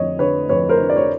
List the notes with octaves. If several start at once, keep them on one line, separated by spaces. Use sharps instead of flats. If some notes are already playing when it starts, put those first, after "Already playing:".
Already playing: F2 D3 C#5 D#5
D3 B4 C#5
F2 B4 C#5
A#4 C5
D3
D5
C#5